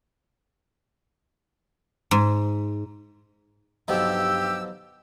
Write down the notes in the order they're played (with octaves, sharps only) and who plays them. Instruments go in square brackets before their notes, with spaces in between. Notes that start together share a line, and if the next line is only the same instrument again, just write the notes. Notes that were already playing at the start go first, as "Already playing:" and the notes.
[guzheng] G#2
[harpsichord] B1 B2 F3 [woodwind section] G2 E6 [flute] G4